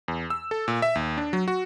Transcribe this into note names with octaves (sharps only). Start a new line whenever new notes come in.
E2
E6
A4
A#2
E5
D#2
D4
F#3
F#4